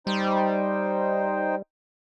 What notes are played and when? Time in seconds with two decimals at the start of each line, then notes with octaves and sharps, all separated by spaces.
0.07 G3 D#4 C5 G5